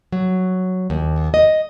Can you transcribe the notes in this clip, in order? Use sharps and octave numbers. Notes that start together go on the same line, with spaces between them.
F#3
D#2
D#5